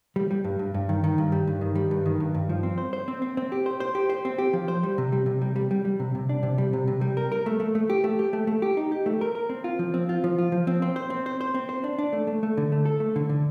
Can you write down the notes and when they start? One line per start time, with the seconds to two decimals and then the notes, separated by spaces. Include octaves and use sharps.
0.16 G3
0.31 G3
0.44 G2
0.59 G2
0.74 G2
0.89 D#3
1.04 D#3
1.18 G2
1.32 G3
1.47 G2
1.61 D#3
1.75 G3
1.91 G2
2.06 D#3
2.20 G2
2.34 G2
2.49 F3
2.63 C4
2.78 C5
2.93 C5
3.08 C4
3.22 C4
3.37 C4
3.52 G4
3.66 C5
3.80 C5
3.95 G4
4.09 C5
4.25 C4
4.38 G4
4.53 F3
4.68 C5
4.83 G3
4.98 C3
5.12 G3
5.26 C3
5.42 G3
5.56 G3
5.71 G3
5.85 G3
6.00 C3
6.15 C3
6.29 D4
6.43 C3
6.58 G3
6.73 C3
6.88 C3
7.01 G3
7.17 A#4
7.32 A#4
7.46 A3
7.60 A3
7.75 A3
7.90 G4
8.04 A3
8.19 G4
8.33 A3
8.47 A3
8.62 G4
8.77 D#4
8.92 G4
9.06 A3
9.21 A#4
9.35 A#4
9.50 C4
9.64 F4
9.79 F3
9.94 C4
10.09 F4
10.24 F3
10.38 F4
10.52 F3
10.67 C4
10.82 C4
10.96 C5
11.10 C4
11.26 C5
11.41 C5
11.54 C4
11.69 C5
11.84 D4
11.99 D4
12.13 A3
12.27 A3
12.43 A3
12.57 D3
12.72 A3
12.86 A4
13.00 A3
13.16 D3
13.29 D3